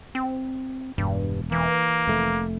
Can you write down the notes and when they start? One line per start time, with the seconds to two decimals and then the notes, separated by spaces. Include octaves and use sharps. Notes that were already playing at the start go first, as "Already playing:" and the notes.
0.15 C4
0.98 E1 G2
1.52 E3 A#3
2.07 F1 A3